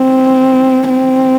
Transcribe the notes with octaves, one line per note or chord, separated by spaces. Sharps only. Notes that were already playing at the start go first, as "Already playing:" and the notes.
Already playing: C4
C4